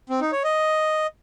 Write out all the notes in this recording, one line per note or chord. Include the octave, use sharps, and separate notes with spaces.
C4
D#4
C#5
D#5